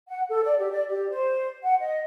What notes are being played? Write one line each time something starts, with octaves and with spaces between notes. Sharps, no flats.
F#5
A4
D5
G4
D5
G4
C5
F#5
D#5